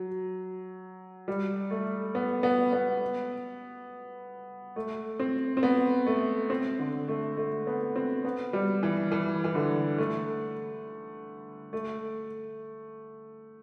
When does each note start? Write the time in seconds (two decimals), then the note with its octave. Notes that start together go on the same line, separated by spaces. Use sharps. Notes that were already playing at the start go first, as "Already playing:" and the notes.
Already playing: F#3
1.28 G3
1.71 A3
2.15 B3
2.43 B3
2.73 B3
4.76 A3
5.19 C4
5.57 C4
5.63 B3
6.07 A3
6.50 C4
6.79 D3
7.08 A3
7.37 A3
7.67 B3
7.96 C4
8.25 B3
8.53 G3
8.83 E3
9.12 E3
9.44 E3
9.55 D3
9.98 A3
11.73 A3